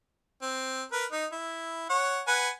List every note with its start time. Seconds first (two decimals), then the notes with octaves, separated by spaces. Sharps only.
0.42 C4
0.92 A#4 B4
1.12 D#4
1.32 E4
1.89 C#5 F#5
2.28 B4 F#5 G#5